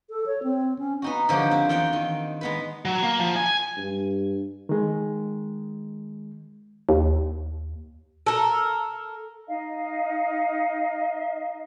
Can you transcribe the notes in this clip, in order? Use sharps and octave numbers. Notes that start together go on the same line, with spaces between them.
A4
C#5
C4
C#4
B3 D#4 F#4
D3 F3 A#3 C#4 G4
C4
E2 F4 F#5 G5
D#3
G#3 B3 B4
F#3
A#3
F3
G#5
G2
D#3 G#3
D#2
A4 A#4
D#4 D#5 F5